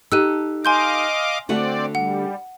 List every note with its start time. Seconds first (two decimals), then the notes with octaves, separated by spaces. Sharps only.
0.12 D#4 G4 A4 E6 F#6 D#7
0.65 D#5 F5 G#5 C6 D6 G6
1.49 D3 A3 C4 F#4 D5
1.95 G3 F#5